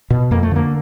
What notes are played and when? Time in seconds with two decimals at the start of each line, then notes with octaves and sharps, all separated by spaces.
0.10 B2
0.31 F2 A#3
0.43 A3
0.51 D3 A#3